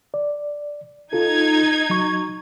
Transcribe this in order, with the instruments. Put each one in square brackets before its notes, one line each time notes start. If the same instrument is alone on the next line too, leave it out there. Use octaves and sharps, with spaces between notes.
[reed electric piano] D5
[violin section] D#4 G#6 [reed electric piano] F4 A4
[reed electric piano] F#3 C#6